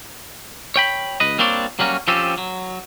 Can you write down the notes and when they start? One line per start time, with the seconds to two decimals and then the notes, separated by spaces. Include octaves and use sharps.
0.76 C#5 G5 B5
1.20 C#2 B4 D#5
1.38 G3 A#3 C4 D4 C#5 D5
1.79 F#3 G3 A#3 C#4 F#4
2.08 F3 C4 C#4 G4 A4
2.38 F#3